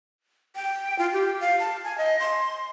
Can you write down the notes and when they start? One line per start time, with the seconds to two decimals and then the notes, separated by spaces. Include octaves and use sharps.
0.56 G5
0.99 F4
1.13 G4
1.40 F5
1.59 A5
1.84 G#5
1.98 D#5
2.20 C6